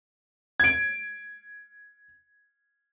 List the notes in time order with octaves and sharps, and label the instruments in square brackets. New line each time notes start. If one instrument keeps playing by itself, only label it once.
[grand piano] G#6 D7